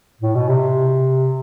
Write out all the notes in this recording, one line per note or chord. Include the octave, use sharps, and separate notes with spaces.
A2
B2
C3